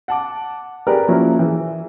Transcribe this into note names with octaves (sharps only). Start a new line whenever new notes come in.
F#5 A5 D6
G4 G#4 A#4 B4 D5
F3 F#3 A#3 C#4 E4
E3 G#4